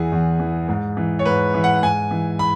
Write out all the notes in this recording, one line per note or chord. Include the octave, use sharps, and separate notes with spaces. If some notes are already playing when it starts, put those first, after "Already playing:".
Already playing: E2 E3 G#4
E2
E3
G#2
E3
C#5
G#2 B4
E3
F#5
G#2 G#5
E3
B5